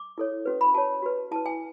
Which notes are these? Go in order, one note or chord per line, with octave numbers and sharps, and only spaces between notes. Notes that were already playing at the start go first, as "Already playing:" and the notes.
Already playing: D6
E4 A4 C#5
C#4 F#4 B4
B5
F#4 C#5 A5
F#4 B4
E4 B4 A5
G#5